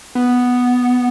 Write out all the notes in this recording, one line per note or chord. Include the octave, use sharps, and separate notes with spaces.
B3